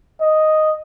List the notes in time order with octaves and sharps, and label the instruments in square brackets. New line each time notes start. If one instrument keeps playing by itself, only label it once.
[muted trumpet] D#5